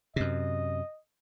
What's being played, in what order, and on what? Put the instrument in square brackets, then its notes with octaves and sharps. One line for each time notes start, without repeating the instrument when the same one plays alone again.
[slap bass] F#2 C3 [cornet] D#5